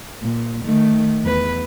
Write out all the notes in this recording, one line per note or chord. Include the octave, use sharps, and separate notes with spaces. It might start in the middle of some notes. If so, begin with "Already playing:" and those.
A#2
D#3 A3
E2 B4